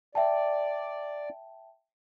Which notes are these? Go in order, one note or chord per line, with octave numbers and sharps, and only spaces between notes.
D5 E5 G5 A5